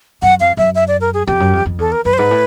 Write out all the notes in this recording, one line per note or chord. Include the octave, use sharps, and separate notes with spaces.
F#2 F#5
F2 F5
F#2 E5
E5
D5
A#4
G#4
F2 G4
F#2
F2
F2
E2 A4
A#4
F#2 B4
C5
G#2 B4
A2